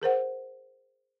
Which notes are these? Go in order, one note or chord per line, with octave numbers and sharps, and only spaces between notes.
G#4 A#4 C5 F#5